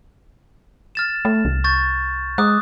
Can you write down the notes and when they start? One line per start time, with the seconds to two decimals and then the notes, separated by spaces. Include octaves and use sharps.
0.95 F6 A6 E7
1.25 A3
1.45 C2
1.64 C#6 G6 A6
2.38 G#3 D6 D#6 F#6